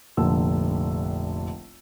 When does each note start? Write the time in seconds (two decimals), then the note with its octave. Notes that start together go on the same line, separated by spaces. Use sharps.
0.17 F1 A#1 D3 E6